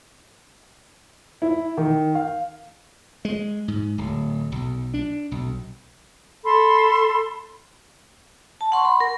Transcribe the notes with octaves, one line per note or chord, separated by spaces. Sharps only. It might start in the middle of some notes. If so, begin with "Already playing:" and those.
E4
D#3
F5
G#3
G#2
D1
B1
D4
B1
A4 B5 C6
A5
F#5 C6 C#6
B5
A#4